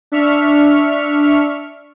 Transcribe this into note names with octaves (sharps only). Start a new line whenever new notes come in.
D4 E5 C#6 F6 B6